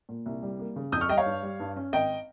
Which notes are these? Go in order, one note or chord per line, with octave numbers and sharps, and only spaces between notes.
A#2
C2
G3
A#3
C#3
F2 D#6 G6
C#6 F6
G3 D#5 G5
C#5 F5
G2
G3
G2
C#4
G#1 D#5 G5